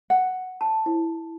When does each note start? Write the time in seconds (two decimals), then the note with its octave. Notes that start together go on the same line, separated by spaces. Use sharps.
0.10 F#5
0.61 A5
0.86 E4